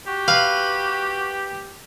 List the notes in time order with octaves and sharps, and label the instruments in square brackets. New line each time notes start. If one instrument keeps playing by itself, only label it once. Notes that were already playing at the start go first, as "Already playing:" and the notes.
[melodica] F#4 [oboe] G4
[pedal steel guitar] B4 [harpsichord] F5